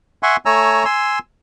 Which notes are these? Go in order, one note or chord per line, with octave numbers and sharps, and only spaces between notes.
E5 F#5 G#5 C6 C#6
A3 C#5 G#5 A#5 E6
G#5 C6 E6